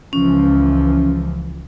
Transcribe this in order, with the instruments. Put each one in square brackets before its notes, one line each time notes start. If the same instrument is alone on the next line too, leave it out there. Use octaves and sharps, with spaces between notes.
[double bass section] C#2 E3 F3 [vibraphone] C#4